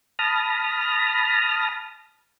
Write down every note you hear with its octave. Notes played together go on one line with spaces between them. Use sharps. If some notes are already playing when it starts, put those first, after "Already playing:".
A5 B5 D#6 F6 A#6